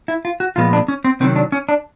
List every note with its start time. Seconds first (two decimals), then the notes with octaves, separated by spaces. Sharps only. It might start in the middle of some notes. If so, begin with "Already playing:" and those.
0.08 E4
0.25 F4
0.40 F#4
0.56 A#2 F3 G#3 B3 F4
0.73 D4
0.88 C#4
1.04 C4
1.20 C3 D#3 F#3 C4
1.36 D4
1.52 C#4
1.69 D4